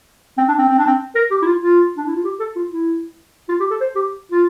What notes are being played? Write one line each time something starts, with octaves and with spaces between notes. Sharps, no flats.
C4
D4
C4
C4
D4
C4
A#4
G4
E4
F4
F4
D4
E4
F4
G4
A4
F4
E4
F4
G4
A4
C5
G4
F4